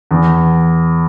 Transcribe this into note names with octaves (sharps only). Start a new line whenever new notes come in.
E2